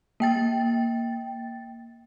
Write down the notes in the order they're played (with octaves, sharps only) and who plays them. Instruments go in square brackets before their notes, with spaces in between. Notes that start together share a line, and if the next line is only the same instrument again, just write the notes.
[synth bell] A#3 G5 A6